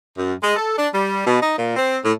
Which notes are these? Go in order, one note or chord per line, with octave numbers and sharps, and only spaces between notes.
F#2
G#3
A4
D4
G3
B2
D#4
A#2
C4
A2